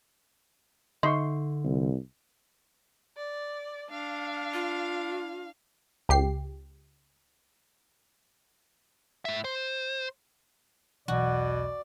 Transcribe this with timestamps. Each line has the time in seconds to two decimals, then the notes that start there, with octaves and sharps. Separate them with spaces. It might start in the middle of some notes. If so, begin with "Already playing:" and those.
1.03 D3 D#4 E5 C6 C#6
1.64 C2
3.17 D5
3.91 D4 F5
4.53 F4
6.09 C#2 G4 C7
9.25 A2 E5
9.44 C5
11.08 B1 E2 B2 F#4 D5